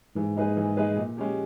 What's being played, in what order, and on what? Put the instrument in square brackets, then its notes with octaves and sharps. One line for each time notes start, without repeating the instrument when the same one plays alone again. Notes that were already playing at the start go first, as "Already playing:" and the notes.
[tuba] G#2 [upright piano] E3
[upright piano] G#3 D#4 G#4 B4
E3
G#3 D#4 G#4 B4
A#2
G#3 C#4 G4